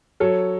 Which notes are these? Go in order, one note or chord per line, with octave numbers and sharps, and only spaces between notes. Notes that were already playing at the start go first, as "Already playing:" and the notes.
F#3 A4 C#5